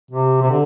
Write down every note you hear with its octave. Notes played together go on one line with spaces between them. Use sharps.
C3
C3
D3